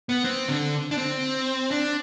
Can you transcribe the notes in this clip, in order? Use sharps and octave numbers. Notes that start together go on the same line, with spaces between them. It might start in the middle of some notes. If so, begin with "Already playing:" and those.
B3
C4
D3
D4
C4
D4